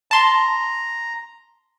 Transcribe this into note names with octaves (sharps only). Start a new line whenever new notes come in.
A5 A#5 C6